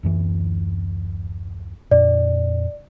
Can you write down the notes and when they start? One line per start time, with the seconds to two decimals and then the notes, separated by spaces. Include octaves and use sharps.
0.03 D1 F#2 E3
1.91 F2 A#2 D5